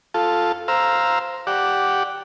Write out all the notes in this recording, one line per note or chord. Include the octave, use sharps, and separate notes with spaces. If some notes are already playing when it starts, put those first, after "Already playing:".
F4 A4
C5 F5 A#5 E6
G4 D5 F#5